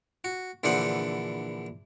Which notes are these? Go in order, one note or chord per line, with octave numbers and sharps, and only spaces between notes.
F#4
A#1 D3 E3 G#4 C5 F#5